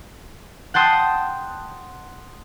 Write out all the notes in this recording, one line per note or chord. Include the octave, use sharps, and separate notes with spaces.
F#5 G5 A5 C6 D#6